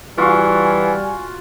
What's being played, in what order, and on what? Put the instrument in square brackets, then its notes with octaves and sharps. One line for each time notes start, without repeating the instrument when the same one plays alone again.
[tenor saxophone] E3 [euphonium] G3 [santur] F4 F#4 F5 [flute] G#5